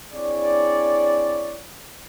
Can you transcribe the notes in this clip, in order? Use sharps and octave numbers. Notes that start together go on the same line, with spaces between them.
C4 D4 E4 G#4 C#5 D5